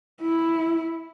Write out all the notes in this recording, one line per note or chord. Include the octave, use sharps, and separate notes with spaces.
E4